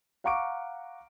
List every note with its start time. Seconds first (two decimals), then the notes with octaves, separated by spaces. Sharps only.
0.24 F5 F#5 A#5 C#6 D6 D7